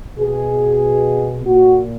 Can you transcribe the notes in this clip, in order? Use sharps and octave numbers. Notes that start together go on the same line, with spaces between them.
B2 G#4
A#2 F#4